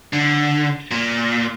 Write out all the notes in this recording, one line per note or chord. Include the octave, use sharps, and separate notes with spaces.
D3
A#2